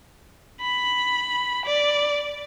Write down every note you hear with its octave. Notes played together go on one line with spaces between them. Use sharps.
B5
D5